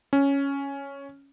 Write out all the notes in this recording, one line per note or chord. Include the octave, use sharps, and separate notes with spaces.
C#4